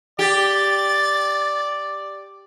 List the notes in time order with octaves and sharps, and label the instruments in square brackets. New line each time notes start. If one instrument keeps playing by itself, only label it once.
[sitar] G4 [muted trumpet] D5 [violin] A6